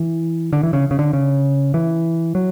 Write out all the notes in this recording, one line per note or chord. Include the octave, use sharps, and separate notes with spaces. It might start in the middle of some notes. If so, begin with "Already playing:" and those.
Already playing: E3
D3
E3
C#3
C#3
D3
C#3
E3
F#3